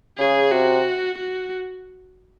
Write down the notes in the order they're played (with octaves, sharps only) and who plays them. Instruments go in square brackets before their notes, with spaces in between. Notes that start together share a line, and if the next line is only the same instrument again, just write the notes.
[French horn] C#3 [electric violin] G#4
[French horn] C3 [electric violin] F#4
[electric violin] F#4